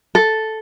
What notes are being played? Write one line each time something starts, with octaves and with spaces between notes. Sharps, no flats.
A4